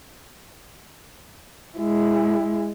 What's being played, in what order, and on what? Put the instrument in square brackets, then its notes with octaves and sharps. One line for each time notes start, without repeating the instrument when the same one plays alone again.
[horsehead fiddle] G#3 E4